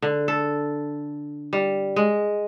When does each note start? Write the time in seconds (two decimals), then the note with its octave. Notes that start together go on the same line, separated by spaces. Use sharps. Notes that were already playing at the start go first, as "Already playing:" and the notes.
0.02 D3
0.28 A4
1.53 G3
1.96 G#3